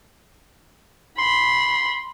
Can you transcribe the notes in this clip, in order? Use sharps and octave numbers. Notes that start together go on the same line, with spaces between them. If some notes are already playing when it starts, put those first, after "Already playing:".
B5 C6